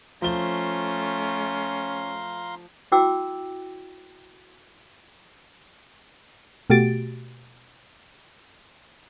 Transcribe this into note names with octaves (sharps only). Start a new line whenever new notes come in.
F3 A3 C#4 F5 A#5 C6 G7
E4 F#4 G5 D6 E6
B2 A3 F#4 G4 A6 D7